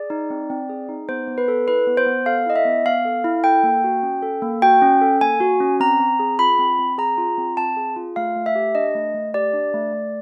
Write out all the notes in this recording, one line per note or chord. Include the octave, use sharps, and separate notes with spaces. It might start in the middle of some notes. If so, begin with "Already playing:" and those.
Already playing: G#4 D5
D#4
C4
C4
G#4
D#4
B3 C5
B3
B4
A4
E4 B4
B3
C5
B3
A4 F5
E4 D#5
E5
B3
B3 F5
A4
E4
A4 G5
A#3
F#4
C#4
A4
A#3
F#4 G5
C#4
A4
A#3 G#5
F#4
C#4
C4 A#5
C4
G#4
F4 B5
C4
C4
G#4 A#5
F4
C4
C4 A5
G#4
F4
A3 F5
A3
E5
G4
D4 D#5
A3
A3
G4 D5
D4
A3
A3